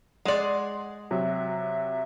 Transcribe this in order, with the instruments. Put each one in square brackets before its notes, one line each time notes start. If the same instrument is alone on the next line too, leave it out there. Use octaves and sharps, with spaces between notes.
[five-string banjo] G#3 D5 [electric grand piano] F#5 C6
[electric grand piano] C3 F#3 F#4 [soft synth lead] E5